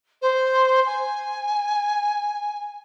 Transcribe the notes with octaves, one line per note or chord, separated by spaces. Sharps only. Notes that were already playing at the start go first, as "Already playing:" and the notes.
C5
G#5